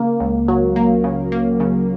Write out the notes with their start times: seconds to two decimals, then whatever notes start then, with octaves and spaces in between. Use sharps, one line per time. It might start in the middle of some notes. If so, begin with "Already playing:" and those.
Already playing: C#3 A#3
0.20 C#2
0.48 F#3
0.76 A#3
1.04 C#3
1.32 A#3
1.60 C#3